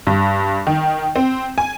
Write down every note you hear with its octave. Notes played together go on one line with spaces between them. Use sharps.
G2
D#3
C4
G#5